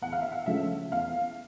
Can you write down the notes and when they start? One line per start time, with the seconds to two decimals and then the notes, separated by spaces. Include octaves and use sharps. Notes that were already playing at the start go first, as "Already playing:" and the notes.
0.02 E2 F#5
0.12 F5
0.21 E5
0.32 F5
0.46 C#3 F3 A3 C#4 E5
0.92 E2 F5